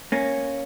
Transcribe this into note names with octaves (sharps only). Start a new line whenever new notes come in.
A#3 C#4